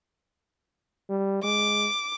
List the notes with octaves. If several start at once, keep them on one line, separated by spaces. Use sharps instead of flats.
G3
G#3 D6